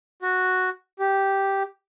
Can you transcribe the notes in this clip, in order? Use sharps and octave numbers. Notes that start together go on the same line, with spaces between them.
F#4
G4